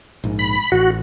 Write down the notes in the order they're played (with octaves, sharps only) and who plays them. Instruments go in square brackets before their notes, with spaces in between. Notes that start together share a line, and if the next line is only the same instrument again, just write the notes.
[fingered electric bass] A#1 G#2
[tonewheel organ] B5
[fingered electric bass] A1 [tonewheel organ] F#4